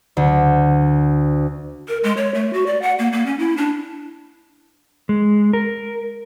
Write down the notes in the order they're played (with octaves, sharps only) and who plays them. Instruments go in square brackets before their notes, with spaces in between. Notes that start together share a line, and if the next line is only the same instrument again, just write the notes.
[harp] D2
[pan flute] A#4
G#3
C#5
A3
F#4
D5
F#5
A#3
A#3
C#4
E4
D4
[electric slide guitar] G#3
A#4